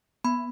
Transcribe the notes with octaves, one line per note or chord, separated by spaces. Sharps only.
B3 B5